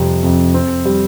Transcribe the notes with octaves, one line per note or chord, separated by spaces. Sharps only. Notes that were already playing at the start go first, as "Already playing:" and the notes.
Already playing: F2 C3 G3
F2
C4
G3